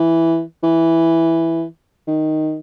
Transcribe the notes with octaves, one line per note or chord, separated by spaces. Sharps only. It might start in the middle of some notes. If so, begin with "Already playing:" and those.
Already playing: E3
E3
D#3